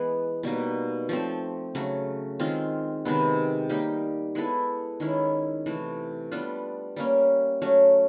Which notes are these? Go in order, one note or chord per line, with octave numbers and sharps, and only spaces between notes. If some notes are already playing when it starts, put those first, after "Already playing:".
Already playing: E3 G#3 B3
B2 G3 A#3 D#4
F3 A3 C4
C#3 F#3 A3
D#3 G#3 C4 F4
C3 D#3 G#3 B3
G3 A#3 D#4 G4
G#3 B3 E4 A4
D#3 G#3 C#4 E4
C3 E3 A3
G3 B3 D4 F4
G3 A#3 C#4
F#3 A3 C#4